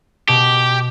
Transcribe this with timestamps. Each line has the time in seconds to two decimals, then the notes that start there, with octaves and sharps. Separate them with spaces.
0.28 B2 G4